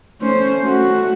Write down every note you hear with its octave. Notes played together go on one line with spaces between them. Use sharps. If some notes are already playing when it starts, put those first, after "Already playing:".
A3 C#4 C5
A3 F#4